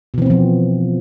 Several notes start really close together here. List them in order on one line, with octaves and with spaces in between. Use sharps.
B2 E3 C4 B3 F3